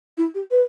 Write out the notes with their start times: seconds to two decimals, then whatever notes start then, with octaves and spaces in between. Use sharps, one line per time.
0.18 E4
0.35 G4
0.51 B4